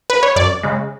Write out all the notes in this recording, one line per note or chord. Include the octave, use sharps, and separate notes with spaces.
B4
C#5
F#2 D5
C#3 G#3